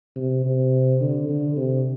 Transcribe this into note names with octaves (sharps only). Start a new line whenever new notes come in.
C3
C3
D3
D3
C3